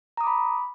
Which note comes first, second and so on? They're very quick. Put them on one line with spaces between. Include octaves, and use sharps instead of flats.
A#5 D#6 D6 B5